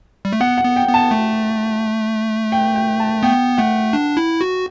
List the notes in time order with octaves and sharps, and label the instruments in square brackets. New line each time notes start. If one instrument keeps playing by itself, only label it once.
[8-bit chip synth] G3
A3
[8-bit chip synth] B3 [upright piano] F#5
[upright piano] F#5
[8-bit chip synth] B3
[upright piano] G5
[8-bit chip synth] B3
[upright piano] A5
[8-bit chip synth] A3
[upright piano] G5
G5
A5
[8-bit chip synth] B3 [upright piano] G5
[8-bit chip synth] A3 [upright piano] F#5
[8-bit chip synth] D4
E4
F#4